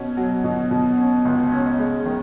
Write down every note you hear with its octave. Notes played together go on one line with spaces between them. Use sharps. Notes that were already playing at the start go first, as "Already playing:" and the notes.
Already playing: B2 C#4
F#3
B2
B2
C#4
C#2
C#4
G#3
D#3